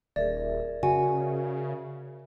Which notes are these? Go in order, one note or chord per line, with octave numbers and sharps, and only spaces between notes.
D#1 G#4 A#4 D5 E5
C#3 F#4 G#5